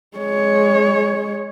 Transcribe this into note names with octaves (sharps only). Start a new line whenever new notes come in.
G#3 C#5